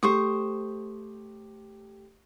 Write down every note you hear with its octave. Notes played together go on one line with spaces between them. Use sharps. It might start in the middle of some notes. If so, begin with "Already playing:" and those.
A3 G4 C5 C#6 D#6